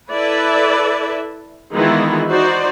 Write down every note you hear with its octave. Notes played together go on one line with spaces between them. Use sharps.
E4 A4 B4 D5 E5
D#3 E3 G#3 B3 E4 F4
D#4 F#4 C5 D5